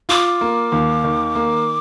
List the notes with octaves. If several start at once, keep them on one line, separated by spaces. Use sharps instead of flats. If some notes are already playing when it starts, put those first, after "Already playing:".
F4 D6
A#3
D#2
D#3
A#3